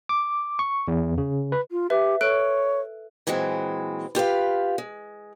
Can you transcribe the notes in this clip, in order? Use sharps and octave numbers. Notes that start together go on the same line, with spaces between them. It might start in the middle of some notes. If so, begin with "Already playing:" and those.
D6
C#6
E2
C#3
B4
F4
G4 B4 E5
A4 C#5 F#6 D7
A#2 E3 F#3 G#3 C4
F4 G4 B4 F5
G#3